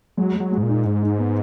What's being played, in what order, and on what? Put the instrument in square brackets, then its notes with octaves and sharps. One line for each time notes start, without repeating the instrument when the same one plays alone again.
[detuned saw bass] F#3 [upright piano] G#3
[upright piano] G#3
[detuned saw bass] F#3
[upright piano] G#3
[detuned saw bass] G#2
A#2
[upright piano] D#4
[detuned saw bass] G#2 [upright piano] D#4
[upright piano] D#4
B3